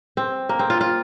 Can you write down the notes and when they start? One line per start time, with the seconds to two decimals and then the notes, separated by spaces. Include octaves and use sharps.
0.17 C4
0.49 A#3
0.59 C4
0.70 F4
0.81 F4